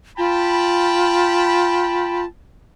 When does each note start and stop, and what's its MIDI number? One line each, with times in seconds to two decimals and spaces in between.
0.18 2.25 65
0.18 2.24 79
0.18 2.24 81
0.18 2.24 83